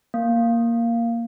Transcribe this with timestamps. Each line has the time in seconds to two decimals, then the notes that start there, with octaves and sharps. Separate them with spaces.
0.14 A#3